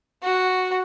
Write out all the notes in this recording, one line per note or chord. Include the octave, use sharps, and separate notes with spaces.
F#4